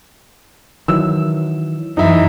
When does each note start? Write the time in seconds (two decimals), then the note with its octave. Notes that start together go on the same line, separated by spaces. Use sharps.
0.88 D#3 E3 F#3 E6
1.97 F#2 E3 D#4 E4